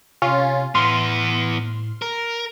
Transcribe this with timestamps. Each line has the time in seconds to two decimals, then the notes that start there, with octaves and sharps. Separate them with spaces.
0.22 C3 C#4 F4
0.75 A2 E3 B3 C6 F6
2.02 A#4